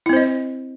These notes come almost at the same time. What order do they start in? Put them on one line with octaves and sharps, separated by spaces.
E4 C4 C5 D#5